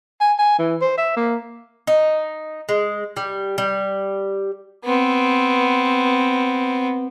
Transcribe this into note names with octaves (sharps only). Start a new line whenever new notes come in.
G#5
G#5
E3
C5
E5
A#3
D#4
G#3
G3
G3
B3 C4